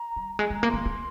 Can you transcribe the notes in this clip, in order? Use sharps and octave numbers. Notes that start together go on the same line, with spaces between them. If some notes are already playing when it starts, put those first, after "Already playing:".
Already playing: A#5
G3
G#3 G#5
G#3 A#5
A#3
G#3 C6
G#3